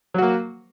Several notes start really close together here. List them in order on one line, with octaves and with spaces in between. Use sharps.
F#3 F#4 A#3